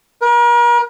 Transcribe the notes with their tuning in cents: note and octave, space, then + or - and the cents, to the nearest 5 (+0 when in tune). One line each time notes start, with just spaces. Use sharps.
A#4 +40